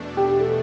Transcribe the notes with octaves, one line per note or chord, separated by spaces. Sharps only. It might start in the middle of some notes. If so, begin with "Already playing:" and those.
Already playing: E2 B2 A3 D4
G4
A4